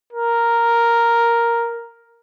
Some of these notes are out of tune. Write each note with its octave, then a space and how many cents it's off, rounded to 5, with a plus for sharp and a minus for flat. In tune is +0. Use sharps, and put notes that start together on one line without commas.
A#4 +0